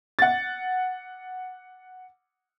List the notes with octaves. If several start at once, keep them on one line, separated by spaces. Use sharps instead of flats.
F#5 A6